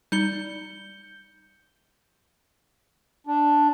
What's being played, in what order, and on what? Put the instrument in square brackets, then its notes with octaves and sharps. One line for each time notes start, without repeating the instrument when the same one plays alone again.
[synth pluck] G3 D#4 [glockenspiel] G6 C#7 G7
[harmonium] D4